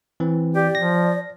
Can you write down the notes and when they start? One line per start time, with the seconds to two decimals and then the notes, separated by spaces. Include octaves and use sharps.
0.20 E3 C4
0.55 G4 D5
0.75 F3 A#6